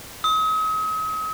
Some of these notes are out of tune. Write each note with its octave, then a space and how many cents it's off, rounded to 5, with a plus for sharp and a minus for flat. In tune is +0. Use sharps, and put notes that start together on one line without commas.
D#6 +40